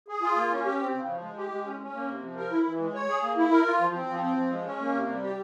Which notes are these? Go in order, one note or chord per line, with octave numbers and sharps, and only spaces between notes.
G#4
F4
A#3
C#4
G4
C4
C#3
F3
G#3
G4
G#3
C#4
C#4
A#3
C3
F3
A#4
E4
E3
G#3
C#5
G#4
A#3
E4
A#4
F4
F3
C4
F3
C4
F3
G#3
C#4
A#3
C3
G3
G4